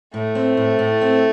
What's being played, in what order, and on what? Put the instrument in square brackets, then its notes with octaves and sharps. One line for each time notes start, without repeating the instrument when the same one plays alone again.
[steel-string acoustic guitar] A2 [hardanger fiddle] A3
[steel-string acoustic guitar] C4
A2
A2
C4